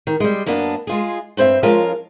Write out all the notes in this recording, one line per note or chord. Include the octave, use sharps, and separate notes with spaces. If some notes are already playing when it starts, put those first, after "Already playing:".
D#3
G3 G#3
F#2 A#3 B3 D4
G#3 F4 G#4
G2 C4 C5 E5
F3 G#3 C#4 F4 A#4 F5